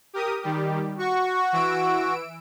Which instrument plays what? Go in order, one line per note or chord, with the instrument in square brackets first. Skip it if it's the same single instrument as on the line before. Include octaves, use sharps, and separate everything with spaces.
[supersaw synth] G4 A#4 D#6
D#3 G3 G4
[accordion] F#4 [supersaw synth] C#6
[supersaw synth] E3 E6 D7